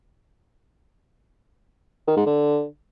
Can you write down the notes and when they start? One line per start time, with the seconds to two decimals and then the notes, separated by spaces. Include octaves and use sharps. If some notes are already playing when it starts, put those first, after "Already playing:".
2.07 D#3
2.17 G#2
2.26 D3